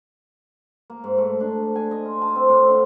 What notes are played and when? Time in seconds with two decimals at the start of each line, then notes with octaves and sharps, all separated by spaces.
0.90 A#3
1.04 G#2
1.18 A3
1.40 D4
1.75 G#5
1.91 D#5
2.05 F4
2.21 A5
2.36 C4
2.49 A2
2.67 D3